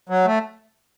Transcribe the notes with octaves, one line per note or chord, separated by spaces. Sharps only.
F#3
A3